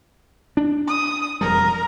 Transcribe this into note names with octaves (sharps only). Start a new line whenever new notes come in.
D4
D#6
E1 F2 G3 A#4